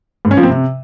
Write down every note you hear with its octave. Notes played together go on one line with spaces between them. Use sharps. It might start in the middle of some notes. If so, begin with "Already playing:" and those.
G#2
C#4
F3
C4
C3